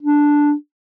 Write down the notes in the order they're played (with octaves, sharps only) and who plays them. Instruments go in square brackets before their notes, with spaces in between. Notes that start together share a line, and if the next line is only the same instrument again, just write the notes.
[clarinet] D4